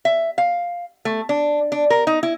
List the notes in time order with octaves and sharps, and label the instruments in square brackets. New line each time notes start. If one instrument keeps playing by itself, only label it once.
[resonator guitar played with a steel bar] E5
F5
A3
D4
D4
A#4
D#4
E4